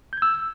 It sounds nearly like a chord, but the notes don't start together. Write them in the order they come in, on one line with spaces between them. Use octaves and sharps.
G6 G#6 E6